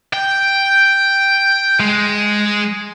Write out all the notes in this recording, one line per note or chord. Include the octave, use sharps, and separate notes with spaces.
G5
G#3